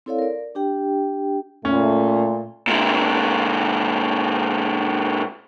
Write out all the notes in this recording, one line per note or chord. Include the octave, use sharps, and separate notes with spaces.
C4 E4 A4 C#5 D5 F5
A#4 D5
D4 G4 G5
A#2 A3 C#4
A#2 G#3